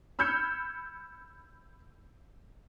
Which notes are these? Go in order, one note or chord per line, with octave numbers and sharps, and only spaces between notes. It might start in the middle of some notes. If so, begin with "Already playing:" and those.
B5 E6 F6 G6 G#6 C#7